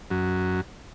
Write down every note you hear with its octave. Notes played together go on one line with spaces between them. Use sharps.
F#2